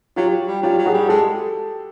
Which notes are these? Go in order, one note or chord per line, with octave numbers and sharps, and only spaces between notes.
F#3 F4 G4
G3
F#3 F4 G4
F#3
F#4 G#4
G3
G#3 G4 A4